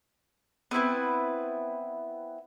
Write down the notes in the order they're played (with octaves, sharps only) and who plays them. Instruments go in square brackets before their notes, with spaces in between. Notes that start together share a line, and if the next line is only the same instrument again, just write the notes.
[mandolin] B3 C4 E4 B4